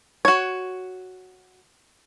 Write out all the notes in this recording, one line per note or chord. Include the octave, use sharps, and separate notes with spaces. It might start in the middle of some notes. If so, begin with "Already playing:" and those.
F#4 C#5